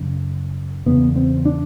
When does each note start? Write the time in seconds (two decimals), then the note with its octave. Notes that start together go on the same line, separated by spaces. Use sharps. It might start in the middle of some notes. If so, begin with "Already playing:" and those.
Already playing: F#2 C#3
0.86 E2 C#3 B3
1.16 C4
1.45 D4